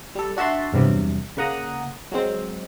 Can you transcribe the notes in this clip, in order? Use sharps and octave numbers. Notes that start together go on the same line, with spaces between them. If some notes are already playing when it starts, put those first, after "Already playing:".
G3 A4
D4 F#4 E5 A5 C6
E2 G2 C3 F#3
C#3 A#3 F#5 A#5 D#6
F#3 G#3 C4